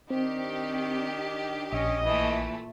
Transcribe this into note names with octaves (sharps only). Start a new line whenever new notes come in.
D#3 C4 D4 G4
A#1 C#4 D#5
A#2 E3 A3